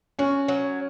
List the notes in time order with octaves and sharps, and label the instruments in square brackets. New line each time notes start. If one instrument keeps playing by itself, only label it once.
[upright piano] C#4 [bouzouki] F#4
[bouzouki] F#3